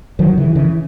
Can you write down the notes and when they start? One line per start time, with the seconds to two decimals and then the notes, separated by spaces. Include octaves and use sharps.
0.19 D#3 F#3
0.38 C#3 E3
0.55 C#3 E3